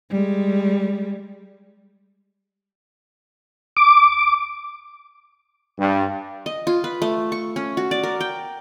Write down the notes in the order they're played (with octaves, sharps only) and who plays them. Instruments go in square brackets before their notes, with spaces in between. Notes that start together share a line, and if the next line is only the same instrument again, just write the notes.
[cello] G3 G#3
[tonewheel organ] D6
[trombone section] G2
[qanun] D#5
F4
B4
A3
C#6
C#4
F#4
D5
A#4
G5